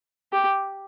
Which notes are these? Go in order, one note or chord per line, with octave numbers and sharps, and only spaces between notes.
G4